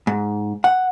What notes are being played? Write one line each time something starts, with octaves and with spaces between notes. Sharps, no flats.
G#2
F#5